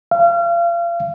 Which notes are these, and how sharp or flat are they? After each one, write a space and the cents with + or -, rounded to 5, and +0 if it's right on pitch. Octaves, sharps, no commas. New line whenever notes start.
F5 -35